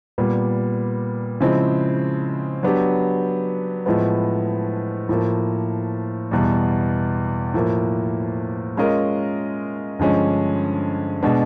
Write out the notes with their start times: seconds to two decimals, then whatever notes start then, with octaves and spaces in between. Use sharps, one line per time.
0.18 A#2 G3 B3
1.40 C#3 F3 G#3 C4 E4
2.63 F#3 B3 D4 G4
3.86 A2 F3 G#3 B3
5.09 A2 F3 A#3
6.31 E2 B2 G3
7.54 A2 F3 A#3
8.77 G#3 C#4 F4 A#4 D#5
9.99 G2 D3 F3 G#3 C#4
11.23 B2 G#3 B3 D4